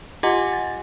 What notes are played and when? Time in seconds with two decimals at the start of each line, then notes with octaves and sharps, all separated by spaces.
0.23 F4 G4 D#5 F#5 G#5 D6
0.53 A6